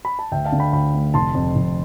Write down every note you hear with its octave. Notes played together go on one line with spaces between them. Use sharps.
B5
A5
D2 E5 G5
F5 A5
D3
G5 B5
D2 G5 B5
A3
F1 A5 C6
F2
F1